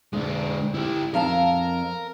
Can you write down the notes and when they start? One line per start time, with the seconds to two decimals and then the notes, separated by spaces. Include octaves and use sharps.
0.13 D2 G#3 D4
0.74 E4 G4
1.14 F2 A#4 F5 A5